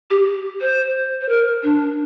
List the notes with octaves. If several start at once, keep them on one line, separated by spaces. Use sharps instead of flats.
G4
C5
C5
A#4
D4